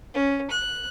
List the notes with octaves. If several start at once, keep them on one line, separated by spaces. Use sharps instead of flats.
C#4
F#6